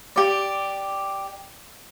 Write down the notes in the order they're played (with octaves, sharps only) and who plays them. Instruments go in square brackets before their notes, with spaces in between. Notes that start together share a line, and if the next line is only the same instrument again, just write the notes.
[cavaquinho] G4 D5